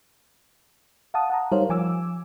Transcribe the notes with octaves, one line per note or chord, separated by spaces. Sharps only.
F5 F#5 A5 D#6
F#5 A5 A#5
G3 D#4 A#4 C5 C#5 F5
F3 G#5 D6 E6